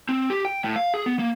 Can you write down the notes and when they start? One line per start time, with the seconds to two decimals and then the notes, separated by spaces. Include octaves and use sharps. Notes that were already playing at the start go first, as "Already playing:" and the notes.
0.09 C4
0.30 G4
0.45 G5
0.64 A2
0.76 F5
0.94 G#4
1.06 B3
1.19 A#3